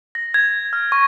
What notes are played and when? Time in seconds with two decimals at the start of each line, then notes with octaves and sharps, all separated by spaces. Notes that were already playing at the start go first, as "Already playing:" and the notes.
0.15 A#6
0.34 G#6
0.73 F6
0.92 C#6